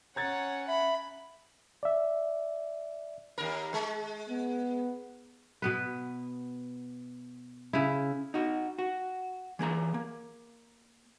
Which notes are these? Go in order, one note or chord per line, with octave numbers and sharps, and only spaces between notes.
C#4 C#5 F#5 A#5 G#6 A6
E5 B5
D5 E5
D#2 A#4
G#3
B3
B2 B3 B4
C#3 E4
D#4 F#4
F#4
E3 A#3 G#4 A#5
A#3